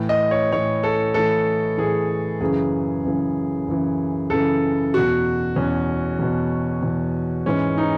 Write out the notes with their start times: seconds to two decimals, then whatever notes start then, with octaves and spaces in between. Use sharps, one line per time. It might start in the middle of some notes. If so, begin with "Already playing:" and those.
Already playing: A2 E3
0.09 D#5
0.31 C#5
0.51 A2 E3 C#5
0.83 A4
1.14 A2 E3 A4
1.78 A2 E3 G#4
2.41 F#2 C#3 E3 G#4
3.05 F#2 C#3 E3
3.68 F#2 C#3 E3
4.30 F#2 C#3 E3 A4
4.94 E2 B2 F#4
5.56 E2 B2 C#4
6.19 E2 B2
6.82 E2 B2
7.46 G#2 E3 C#4
7.78 D#4